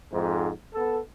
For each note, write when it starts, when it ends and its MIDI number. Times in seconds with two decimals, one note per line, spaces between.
0.12 0.50 41
0.12 0.50 44
0.74 0.99 59
0.74 0.99 69